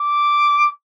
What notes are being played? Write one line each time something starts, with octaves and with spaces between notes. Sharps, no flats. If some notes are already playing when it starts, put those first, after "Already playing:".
Already playing: D6